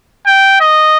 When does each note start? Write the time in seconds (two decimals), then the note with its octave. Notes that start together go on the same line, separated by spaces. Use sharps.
0.27 G5
0.61 D#5